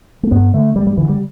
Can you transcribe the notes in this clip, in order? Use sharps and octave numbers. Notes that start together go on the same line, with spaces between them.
A3
G2 B3
D3 A3
G2 G3
G3
D3 E3
G3